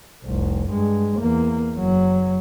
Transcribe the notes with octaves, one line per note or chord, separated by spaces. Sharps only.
F1 C2
G2 G#3
E2 A#3
F#1 F#3